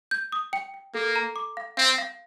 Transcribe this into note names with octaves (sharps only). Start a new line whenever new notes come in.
G6
D#6
G5
G5
A#3 A4
A#5
D6
F5
C4 F5
F5